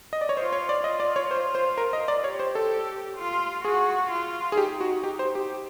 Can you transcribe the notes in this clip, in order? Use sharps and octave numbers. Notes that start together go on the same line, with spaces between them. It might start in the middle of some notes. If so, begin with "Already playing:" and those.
D#5
D5
C#5
F4 C5
C#5
D5
F4 D#5
D5
C#5
C5
C5
A#4
D#5
D5
G4 C#5
C5
A4
F4
F#4 G#4
F4
G#4
D#4 G4
F#4
G4
C5
G4